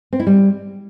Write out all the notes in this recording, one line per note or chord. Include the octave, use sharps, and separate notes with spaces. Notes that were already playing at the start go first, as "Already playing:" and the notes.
C4
E4
G3